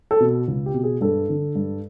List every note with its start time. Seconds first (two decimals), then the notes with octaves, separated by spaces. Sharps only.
0.11 A4
0.20 B2
0.48 C#2
0.66 G4
0.74 B2
0.84 G#4
1.01 G2 A4
1.29 D3
1.55 G2